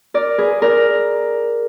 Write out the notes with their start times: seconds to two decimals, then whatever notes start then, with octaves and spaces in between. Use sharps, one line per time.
0.14 A#4 D5
0.38 G#4 B4
0.62 A#4 D5